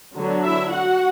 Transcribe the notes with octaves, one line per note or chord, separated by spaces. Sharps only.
D3 F#3 B3 D4
E4 E5
F#4 F#5